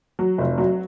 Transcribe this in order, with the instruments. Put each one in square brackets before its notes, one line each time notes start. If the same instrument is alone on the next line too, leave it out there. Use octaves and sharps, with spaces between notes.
[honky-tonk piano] F#3
F1
F#3